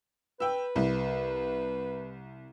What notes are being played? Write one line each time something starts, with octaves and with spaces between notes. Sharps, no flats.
B4 G5 E6
C2